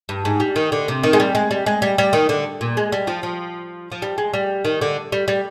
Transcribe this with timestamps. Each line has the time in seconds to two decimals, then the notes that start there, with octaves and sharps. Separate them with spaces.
0.09 G2
0.25 G#2
0.40 G3
0.56 D#3
0.72 D3
0.88 C3
1.03 D#3
1.13 G#3
1.20 G3
1.35 G#3
1.51 G3
1.66 G#3
1.82 G3
1.98 G3
2.13 D#3
2.29 D3
2.61 A#2
2.77 G#3
2.92 G3
3.07 F3
3.23 F3
3.92 F3
4.02 G3
4.18 G#3
4.34 G3
4.65 D#3
4.81 D3
5.12 G3
5.28 G3